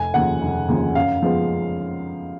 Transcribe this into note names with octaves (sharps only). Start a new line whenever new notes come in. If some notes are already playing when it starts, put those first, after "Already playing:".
Already playing: F1 G#5
D#2 C#3 F3 F#5
F1
D#2 C#3 F3
F#2 F5
F3 G#3 B3